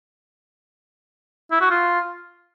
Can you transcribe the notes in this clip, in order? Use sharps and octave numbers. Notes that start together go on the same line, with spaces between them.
E4
F#4
F4